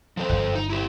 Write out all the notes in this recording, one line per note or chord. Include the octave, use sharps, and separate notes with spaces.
F3 A4 C5
G1
D#4
E4 G4